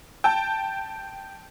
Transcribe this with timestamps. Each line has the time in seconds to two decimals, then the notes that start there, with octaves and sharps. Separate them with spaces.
0.24 G5 A5